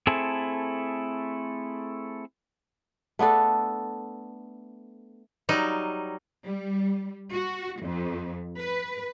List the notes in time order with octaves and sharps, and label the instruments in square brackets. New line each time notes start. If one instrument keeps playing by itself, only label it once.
[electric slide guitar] A3 C4 E4 G#4 A4
[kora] A3 B3 D4 A4
[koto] F#3 G3 D#4
[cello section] G3
F#4
F2
B4